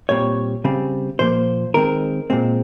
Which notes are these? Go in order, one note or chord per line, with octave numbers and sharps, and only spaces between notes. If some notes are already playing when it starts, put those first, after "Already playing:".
A#2 G3 C4 C#5
C#3 G3 C4
A#2 F3 A#3 C5
D#3 G#3 C4 A#4
A#2 G#3 C4